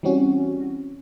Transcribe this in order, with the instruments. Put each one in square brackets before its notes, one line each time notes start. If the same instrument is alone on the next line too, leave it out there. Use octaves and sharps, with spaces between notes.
[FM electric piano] E3 G3 C4 C#4 F#4